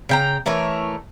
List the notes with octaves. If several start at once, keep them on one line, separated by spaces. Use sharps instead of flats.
C#3 G5 A#5
E3 A3 A#4 C#5